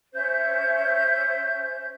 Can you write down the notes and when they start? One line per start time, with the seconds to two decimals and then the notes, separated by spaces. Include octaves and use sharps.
0.14 C#4 C5 E5 G6